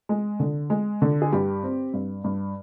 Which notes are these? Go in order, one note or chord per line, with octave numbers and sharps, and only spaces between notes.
G#3
D3
G#3
D3
G#4
G2 G4
C4
G2
G2